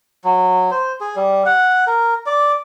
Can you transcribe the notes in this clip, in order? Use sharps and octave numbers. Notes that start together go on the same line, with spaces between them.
F#3
C5
G#4
G3
F#5
A#4
D5